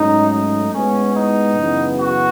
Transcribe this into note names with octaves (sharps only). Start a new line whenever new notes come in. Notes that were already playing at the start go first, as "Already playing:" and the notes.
Already playing: G#2 F#3 A3 C#4 D#4
D#4
A2 G#3 B3 C#4
D#4
F#2 C#3 E3 B3
F#4